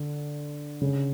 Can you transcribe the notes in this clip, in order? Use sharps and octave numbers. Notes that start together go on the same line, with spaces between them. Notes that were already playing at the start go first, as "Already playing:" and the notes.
Already playing: D3
C#3